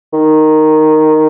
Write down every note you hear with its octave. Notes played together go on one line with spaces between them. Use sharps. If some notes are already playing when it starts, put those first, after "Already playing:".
D#3